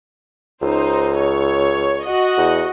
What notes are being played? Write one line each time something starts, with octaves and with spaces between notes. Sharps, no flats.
C#2 D#4 C5
C#5
F#4 D#5 F#5
E2